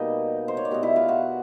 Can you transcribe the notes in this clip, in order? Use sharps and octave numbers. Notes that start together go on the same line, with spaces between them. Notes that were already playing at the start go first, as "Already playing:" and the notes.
Already playing: B2 G3 A#3 D#4 D#5
C5
C#5
D5
B2 G3 B3 D#5
E4 E5
F4 F5
F#4 F#5